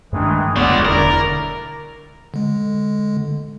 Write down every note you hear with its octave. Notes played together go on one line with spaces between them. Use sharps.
G2 D#3 E3 G#3 A3 D4
F1 D2 G3 G#3 B3 C#5 D5 F#5
E1 D3 E4 A#4 D5
D3 G#3